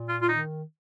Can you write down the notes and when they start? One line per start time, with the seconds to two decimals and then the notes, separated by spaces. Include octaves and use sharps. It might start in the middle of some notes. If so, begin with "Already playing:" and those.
Already playing: A#2
0.09 F4
0.21 F4
0.28 D#3 D#4